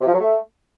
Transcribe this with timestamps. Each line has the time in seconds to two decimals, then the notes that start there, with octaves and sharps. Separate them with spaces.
0.01 C3
0.07 F3
0.13 F#3
0.19 A3